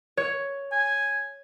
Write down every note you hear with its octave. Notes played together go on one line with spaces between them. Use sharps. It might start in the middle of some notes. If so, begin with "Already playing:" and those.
C#5
G#5